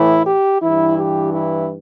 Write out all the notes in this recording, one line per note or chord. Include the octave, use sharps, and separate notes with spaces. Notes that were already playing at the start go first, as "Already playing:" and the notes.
Already playing: A2 E3 E4
G4
G2 E3 E4
G4
E4